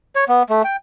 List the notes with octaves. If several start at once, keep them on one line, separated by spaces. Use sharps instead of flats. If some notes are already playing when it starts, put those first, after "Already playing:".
C#5
B3
A3
G5